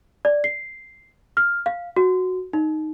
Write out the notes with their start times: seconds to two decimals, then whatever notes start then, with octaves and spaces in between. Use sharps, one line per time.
0.25 D5
0.44 C7
1.37 F6
1.66 F5
1.96 F#4
2.53 D#4